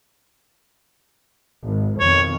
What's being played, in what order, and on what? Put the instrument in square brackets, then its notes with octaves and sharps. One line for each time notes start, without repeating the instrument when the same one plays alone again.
[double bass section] G#1
[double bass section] F2 B2 D#3 [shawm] C#5